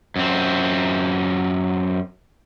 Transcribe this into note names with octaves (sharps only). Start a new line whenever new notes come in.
F#2 C4